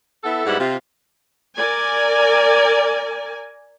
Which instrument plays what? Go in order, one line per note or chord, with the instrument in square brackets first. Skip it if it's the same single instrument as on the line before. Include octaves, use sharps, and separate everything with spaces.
[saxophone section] B3 E4 A4
G#2 G3 B3 E4 F#5
C3 F4
[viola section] A#4 D5 G#5